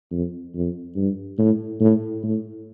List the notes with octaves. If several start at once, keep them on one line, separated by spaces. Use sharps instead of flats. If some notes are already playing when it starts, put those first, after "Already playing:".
F2
F2
G2
A2
A2
A2